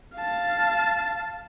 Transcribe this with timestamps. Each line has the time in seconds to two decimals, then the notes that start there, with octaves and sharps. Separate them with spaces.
0.17 F5 A5